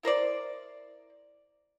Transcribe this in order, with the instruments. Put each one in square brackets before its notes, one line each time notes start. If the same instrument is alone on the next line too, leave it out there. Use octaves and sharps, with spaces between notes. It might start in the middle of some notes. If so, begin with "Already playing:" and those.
[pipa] E4 A#4 C5 D5